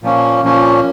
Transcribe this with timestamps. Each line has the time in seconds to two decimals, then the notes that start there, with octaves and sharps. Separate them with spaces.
0.03 A#2 F3 A#3 C#4
0.43 A#2 F3 A#3 C#4